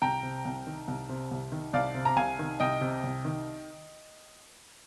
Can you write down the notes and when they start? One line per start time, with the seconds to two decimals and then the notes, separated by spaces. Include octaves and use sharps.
0.02 C2 G5 A#5
0.23 C3
0.45 C2
0.67 D#3
0.88 C2
1.09 C3
1.31 C2
1.52 D#3
1.73 C2 D5 F5
1.95 C3
2.05 A#5
2.16 C2 F5 G#5
2.39 D#3
2.60 C2 D#5 G5
2.81 C3
3.04 C2
3.25 D#3